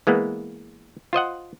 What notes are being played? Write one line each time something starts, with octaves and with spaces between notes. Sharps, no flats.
E3 G#3 A#3 B3
F4 C5 D#5 F#5